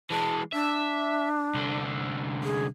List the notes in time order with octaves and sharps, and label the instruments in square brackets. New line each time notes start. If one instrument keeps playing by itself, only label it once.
[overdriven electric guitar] E3 G#3 [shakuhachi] A5
[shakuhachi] D4 [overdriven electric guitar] E5
[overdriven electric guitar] C2 D3
[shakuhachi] G#4